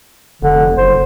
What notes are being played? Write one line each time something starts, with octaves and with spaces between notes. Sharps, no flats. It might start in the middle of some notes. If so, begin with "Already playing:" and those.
F1 D3
F#1 C5